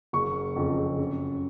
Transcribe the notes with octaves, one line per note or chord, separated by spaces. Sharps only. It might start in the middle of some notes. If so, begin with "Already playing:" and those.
F#1 C#6
F2 C#3
F#2